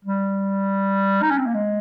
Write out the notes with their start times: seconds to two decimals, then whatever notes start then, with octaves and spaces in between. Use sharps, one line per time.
0.05 G3
1.22 D#4
1.30 C#4
1.38 C4
1.46 A#3
1.54 G#3